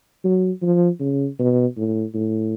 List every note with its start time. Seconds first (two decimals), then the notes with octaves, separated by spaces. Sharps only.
0.24 F#3
0.62 F3
1.00 C#3
1.39 B2
1.77 A2
2.14 A2